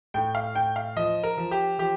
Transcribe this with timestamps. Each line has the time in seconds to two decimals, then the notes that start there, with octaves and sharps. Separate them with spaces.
0.14 A2 G5
0.35 F5
0.55 A2 G5
0.76 F5
0.96 F3 D#5
1.23 A#4
1.37 F3
1.51 G4
1.79 F3 G4